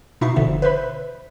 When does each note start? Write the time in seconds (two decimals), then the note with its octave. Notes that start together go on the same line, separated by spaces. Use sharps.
0.21 B2 D#4 E4 E5 C#6 C7
0.36 G1 B2 D3 F3 E5
0.62 B4 C5 E5 B5